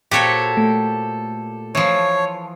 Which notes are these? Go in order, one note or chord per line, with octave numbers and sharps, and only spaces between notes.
A#2 F#4 G4 A4 C5 C#5
A3
E3 F3 C#5